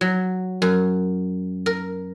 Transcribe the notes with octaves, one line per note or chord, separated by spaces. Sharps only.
F#3
F#2
A#4